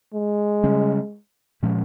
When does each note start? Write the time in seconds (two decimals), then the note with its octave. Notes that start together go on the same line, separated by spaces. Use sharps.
0.14 G#3
0.64 C#3 G3 C#4
1.63 A#2 F3 G#3 C#4